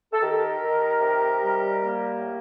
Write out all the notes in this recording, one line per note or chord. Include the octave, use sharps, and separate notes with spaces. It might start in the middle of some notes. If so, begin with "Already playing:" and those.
A4
D#3 G4 A#4
D#3
C3
G3
A#3
A2